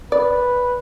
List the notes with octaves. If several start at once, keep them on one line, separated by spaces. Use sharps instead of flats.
B4 D5